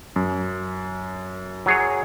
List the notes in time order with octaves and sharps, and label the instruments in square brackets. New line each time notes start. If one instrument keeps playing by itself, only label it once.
[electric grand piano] F#2
[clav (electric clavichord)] F#3 G#4 C#5